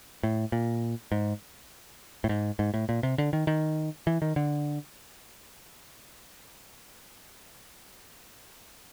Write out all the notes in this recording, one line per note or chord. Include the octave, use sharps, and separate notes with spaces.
A2
A#2
G#2
A2
G#2
G#2
A2
A#2
C3
D3
D#3
D#3
E3
D#3
D3